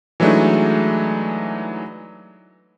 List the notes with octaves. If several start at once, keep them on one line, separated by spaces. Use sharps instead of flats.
E3 F#3 G#3 A3 D4 D#4